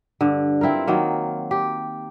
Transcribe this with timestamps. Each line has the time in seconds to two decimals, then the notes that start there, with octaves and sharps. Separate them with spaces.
0.21 G2 D3
0.61 C4 E4 F4 A#4
0.87 D#3 F#3 A#3
1.51 G4